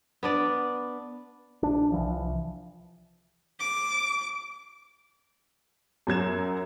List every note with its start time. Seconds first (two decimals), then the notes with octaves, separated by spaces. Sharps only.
0.23 B3 D4 D5
1.63 A#1 D4
1.92 C2 E3 F3
3.60 D6
6.07 F#2 F#3 G#6 E7